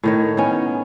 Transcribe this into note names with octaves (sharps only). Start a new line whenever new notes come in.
A2 D#3 C#5
D#3 B3 C#4